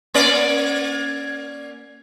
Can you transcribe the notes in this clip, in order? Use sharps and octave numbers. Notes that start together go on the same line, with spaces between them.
A#3 C#4 D5